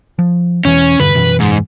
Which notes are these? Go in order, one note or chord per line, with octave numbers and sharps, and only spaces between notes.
F3
E1 E3 C#4
E1 G2 D3 B4
F#2 B2 E3
G#2